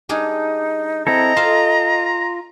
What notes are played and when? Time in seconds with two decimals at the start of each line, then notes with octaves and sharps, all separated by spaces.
0.09 G3 D4 D#4 G#4
1.07 C4 E4 A4 D#5 A#5
1.36 F4 A4 C5 F5